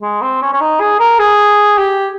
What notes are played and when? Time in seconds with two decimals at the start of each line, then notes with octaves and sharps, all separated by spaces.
0.02 G#3
0.22 C4
0.42 C#4
0.53 C#4
0.61 D#4
0.80 G#4
1.00 A#4
1.19 G#4
1.78 G4